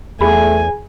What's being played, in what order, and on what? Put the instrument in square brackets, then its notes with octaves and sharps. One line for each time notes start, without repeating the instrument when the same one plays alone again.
[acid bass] E2 [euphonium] A3 [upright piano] G#4 B5 [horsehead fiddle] G#5